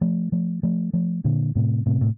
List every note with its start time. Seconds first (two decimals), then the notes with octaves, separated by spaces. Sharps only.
0.01 F3 A3
0.32 F3 A3
0.63 F3 A3
0.93 F3 A3
1.24 A#2 D3
1.55 A2 C3
1.86 A2 C3
2.01 A2